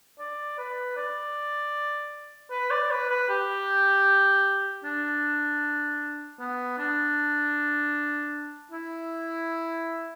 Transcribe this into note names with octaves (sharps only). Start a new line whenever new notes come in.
D5
B4
D5
B4
D5
B4
B4
G4
D4
B3
D4
E4